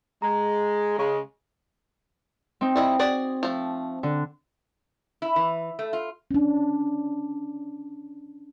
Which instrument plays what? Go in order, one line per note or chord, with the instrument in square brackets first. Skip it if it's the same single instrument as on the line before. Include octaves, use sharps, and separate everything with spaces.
[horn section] G#3 [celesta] A#5
[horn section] C#3 G#3
[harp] C4 D#4
[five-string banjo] G3 E4 D#5
F#4 G#4 D5
F3 A3
[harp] D3
[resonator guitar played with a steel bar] E4
E3
A3
F4
[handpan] C#4 D4